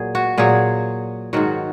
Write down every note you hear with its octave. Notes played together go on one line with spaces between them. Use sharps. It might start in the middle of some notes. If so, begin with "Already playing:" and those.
Already playing: A#2 F#3 G#4
F#4
A#2 F#3 G#4
G#2 D#3 F#3 F#4